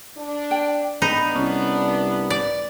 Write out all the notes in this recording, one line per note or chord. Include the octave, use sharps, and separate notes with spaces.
D4
G5
B3 D4 D#4 B4
C2 C#4
D5